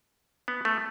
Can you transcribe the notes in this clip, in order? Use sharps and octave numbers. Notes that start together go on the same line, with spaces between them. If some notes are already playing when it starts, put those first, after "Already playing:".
B3
A3